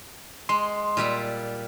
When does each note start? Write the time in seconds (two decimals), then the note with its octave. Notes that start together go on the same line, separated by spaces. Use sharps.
0.49 G#3 C6
0.97 A#2 G3 E5